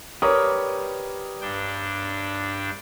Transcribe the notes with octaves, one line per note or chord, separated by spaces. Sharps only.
G4 A#4 B4 C#5 D5 D#6
G2 D4 G5